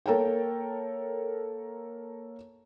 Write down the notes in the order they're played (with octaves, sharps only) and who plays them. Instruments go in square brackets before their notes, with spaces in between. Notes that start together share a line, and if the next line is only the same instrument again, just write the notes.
[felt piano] A#3 A4 A#4 C#5 G5